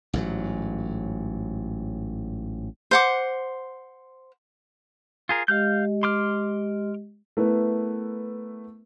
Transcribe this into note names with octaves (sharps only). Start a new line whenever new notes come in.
A1 G#2 C3 F#3
C5 F#5 D6
F4 G#4 A#4
G#3 G4 D#5 F5 F6 G6
C6 D6 F6
A3 B3 E4 A#4 B4